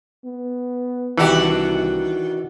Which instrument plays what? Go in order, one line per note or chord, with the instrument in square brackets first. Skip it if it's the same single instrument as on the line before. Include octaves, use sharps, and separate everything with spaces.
[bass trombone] B3
[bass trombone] C2 [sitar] D#3 D4 F#4 [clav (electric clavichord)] E3 G4